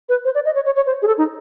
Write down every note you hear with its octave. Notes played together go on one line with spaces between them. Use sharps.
B4
C5
D5
D#5
C#5
C#5
C#5
C5
G#4
A4
D#4